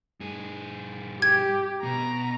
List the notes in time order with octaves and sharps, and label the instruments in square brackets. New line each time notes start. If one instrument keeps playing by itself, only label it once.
[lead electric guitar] G2 G#4
[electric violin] G4 [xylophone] G#6
[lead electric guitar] B2 [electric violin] A#5